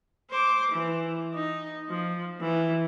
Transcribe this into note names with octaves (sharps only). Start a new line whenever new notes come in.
C5 D6
E3
D#4
F3
E3